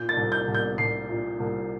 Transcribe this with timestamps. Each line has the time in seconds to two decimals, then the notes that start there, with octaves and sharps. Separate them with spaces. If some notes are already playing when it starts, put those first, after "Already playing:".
Already playing: A#2 G6
0.09 A6
0.17 C2
0.32 G6
0.48 C2
0.54 G6
0.78 C2 C7
1.09 A#2
1.40 C2